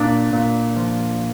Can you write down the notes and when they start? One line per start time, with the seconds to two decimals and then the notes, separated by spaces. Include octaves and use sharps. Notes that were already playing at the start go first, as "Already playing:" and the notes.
Already playing: A#2 D4
0.33 A#2
0.76 F3